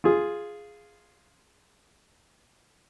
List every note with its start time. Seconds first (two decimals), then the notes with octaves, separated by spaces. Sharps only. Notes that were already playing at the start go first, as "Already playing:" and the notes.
0.04 F4 G#4